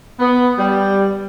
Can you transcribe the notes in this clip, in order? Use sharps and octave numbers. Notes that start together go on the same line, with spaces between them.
B3
G3